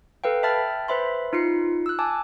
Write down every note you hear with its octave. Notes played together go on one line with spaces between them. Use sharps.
A4 B4 F5 G5
E5 G5 A5 B5 F6 A6
B4 C5 E5 B5 C6
D#4 F4 C7 C#7
E6 F#6
G#5 A5 D6